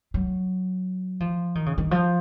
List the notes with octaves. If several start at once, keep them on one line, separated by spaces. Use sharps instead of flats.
F#3
F3
D#3
C#3
D#3
F3